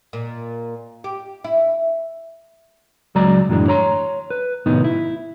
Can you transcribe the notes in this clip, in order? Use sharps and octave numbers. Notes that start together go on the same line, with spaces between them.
A#2
G4
E4
C#2 F#3 G#3 D5 A#5
F#2 A2 D3 E3 G#3 D4
C#5 A#5 C6
B4
C2 A2 D#3 B3 D#4
E4